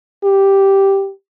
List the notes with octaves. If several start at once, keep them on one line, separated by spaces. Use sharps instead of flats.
G4